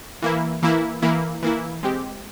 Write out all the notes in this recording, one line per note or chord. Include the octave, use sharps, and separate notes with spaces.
E3 A#3 E4
E3 A#3 E4
E3 A#3 E4
E3 A#3 E4
G#3 C4 G4